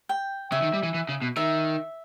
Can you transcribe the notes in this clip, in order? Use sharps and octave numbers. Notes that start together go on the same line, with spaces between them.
G5
C#3 E5
D#3
G3
E3
E3
C#3
B2
D#3 E5